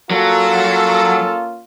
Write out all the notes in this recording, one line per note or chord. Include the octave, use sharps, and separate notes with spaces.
F#3 A#3 C#4 F4 A4